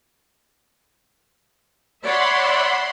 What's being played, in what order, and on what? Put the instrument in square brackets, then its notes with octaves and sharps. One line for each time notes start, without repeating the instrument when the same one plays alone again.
[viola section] C#5 D5 E5 [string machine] F#5 B5 C6